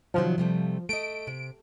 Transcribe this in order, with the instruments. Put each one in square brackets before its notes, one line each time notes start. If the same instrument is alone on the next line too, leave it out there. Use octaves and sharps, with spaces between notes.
[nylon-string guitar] C3 D#3 F#3 [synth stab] F3
[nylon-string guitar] C3 G3 A3
[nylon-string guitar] A3 D#5 [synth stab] D7
[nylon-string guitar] C3